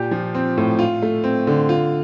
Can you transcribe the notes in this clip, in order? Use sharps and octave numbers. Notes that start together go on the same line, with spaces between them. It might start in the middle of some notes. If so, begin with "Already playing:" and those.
Already playing: A#2 G4
F3
C4
A2
F4
A3
C4
D3
F4